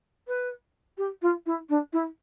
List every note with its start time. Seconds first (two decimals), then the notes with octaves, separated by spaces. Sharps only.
0.27 B4
0.97 G4
1.22 F4
1.46 E4
1.69 D4
1.93 E4